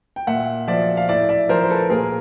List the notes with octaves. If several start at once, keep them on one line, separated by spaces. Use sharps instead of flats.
G5
A#2 E5 F#5
F3 D5 E5
F5
A2 D5 E5
D5 E5
F3 A#4 C5
C5
A4 B4
A#2 G#4 A#4